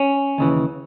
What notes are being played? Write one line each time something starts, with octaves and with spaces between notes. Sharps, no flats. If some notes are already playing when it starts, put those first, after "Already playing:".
Already playing: C#4
D#2 C#3 E3